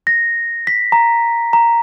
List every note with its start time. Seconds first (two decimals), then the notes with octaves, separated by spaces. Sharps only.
0.07 A#6
0.67 B6
0.92 A#5
1.53 A#5